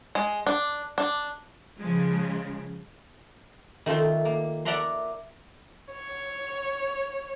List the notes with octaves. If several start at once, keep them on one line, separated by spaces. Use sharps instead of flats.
G#3
D4
D4
C#3 F3 G#3
D#3 A3 F4 C5
A#3
A#4 D5 E5 F#5 A#5 C6
C#5